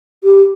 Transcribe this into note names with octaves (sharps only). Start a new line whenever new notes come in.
G4